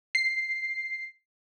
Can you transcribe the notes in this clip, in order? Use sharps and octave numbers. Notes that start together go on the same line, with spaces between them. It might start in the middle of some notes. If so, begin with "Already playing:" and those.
C7